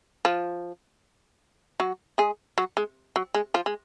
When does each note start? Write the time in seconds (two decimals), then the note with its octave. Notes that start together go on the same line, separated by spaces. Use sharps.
0.25 F3 F4
1.80 F#3 F#4
2.18 G#3 G#4
2.58 F#3 F#4
2.77 G#3
3.16 F#3
3.34 G#3
3.54 F3 F4
3.66 G#3